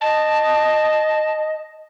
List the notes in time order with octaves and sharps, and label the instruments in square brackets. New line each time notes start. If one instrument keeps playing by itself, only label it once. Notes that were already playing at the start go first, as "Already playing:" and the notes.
[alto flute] D#5 [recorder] A5